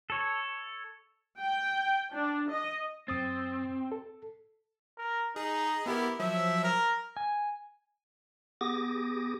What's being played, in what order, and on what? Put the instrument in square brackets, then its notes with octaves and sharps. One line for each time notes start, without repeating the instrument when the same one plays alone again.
[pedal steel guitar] A4 C#5
[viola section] G5
D4
D#5
[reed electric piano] F#2 D#6 A6 [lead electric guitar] C4
[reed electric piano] A4
[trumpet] A#4
[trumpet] D#4 [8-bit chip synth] G#4
[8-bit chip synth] B3 G4 A#4 [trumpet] E4
[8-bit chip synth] F3 F#3 [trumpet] E5
[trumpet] A#4
[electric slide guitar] G#5
[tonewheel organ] B3 G4 G#4 D6 D#6 A#6